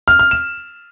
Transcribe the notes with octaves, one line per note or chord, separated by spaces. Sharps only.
F6
F6
E7